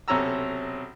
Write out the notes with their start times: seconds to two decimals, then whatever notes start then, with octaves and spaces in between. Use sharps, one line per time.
0.08 B1 C3 C#4 A4 A#5 E6